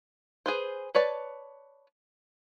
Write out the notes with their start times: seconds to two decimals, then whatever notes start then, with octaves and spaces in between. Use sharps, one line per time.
0.46 G#4 B4 C5
0.95 B4 C#5 D5 A5